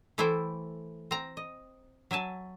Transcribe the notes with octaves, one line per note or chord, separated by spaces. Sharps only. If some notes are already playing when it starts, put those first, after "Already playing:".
E3 A3 E4 A4 C5 G5
C4 A#5
D#5
F#3 E5 G#5 A5